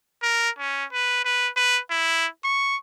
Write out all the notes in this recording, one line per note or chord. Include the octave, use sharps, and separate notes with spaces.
A#4
C#4
B4
B4
B4
E4
C#6